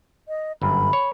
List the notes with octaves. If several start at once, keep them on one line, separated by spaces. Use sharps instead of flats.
D#5
G1 F#2 B5
C#5